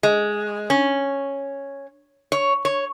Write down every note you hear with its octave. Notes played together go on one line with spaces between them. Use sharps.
G#3
C#4
C#5
C#5